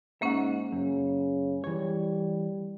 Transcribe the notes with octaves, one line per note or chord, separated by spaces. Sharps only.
G#2 A#3 C#4 E5 F#5
F#2 C#3
E3 G3 C#5